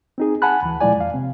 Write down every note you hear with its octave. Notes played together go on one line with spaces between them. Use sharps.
C4 D#4 G#4
F#5 G#5 A5 B5 F#6
D2 E3
A#2 F3 G#3 E4 D5 G#5
F2 F5
C3 C4